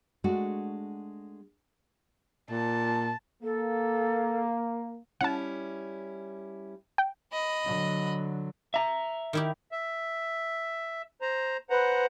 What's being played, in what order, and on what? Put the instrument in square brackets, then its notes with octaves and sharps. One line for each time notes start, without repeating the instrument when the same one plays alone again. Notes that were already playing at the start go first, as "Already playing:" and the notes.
[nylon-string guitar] G#3 A3 D4 F#4
[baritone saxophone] A#2 [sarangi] A5
[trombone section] A#3 [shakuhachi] A4
[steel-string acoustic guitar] G3 C#4 E4 [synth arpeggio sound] F#5 A5
[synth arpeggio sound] G5
[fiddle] D#5 B5
[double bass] D3 F#3
[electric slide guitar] E5 A#5
[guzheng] D#3 E4 G4
[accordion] E5
C5 A#5
[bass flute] B4 [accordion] C5 F#5 A#5